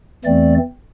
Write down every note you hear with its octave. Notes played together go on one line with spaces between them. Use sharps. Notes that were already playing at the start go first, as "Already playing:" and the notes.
E2 E3 A3 C4 D5